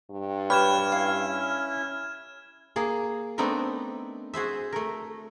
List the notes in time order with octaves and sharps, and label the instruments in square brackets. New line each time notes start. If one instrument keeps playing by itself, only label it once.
[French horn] G2
[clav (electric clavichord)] G4 B4 C#5 [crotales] F6 G#6 E7
[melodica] C#4 E4 [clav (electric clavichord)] F5
[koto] A#3 G#4
A3 B3 C4 D4 D#4 A#4
F#4 G#4 C5 E5
A3 A#4